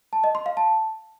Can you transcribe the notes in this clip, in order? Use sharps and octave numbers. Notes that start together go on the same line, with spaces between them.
A5
D#5
C6
F5
A5